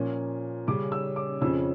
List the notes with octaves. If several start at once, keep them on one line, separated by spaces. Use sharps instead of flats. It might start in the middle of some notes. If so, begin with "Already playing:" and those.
Already playing: A#2 F3 A#3 C#4
C#3 G3 C#4 D6
E6
D6
F2 C#3 F3 C#4 E6